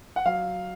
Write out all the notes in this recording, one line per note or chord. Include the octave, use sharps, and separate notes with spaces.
F#5
F#3 F5